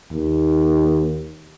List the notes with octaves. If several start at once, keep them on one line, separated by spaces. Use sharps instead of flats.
D#2